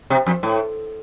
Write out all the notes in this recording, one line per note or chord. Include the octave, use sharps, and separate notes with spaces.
C3
F2
A2